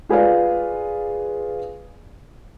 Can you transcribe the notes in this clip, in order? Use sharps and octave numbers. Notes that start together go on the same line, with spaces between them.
F4 G#4 B4 D5 F5